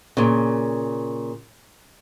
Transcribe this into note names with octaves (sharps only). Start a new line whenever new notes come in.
A#2 C#3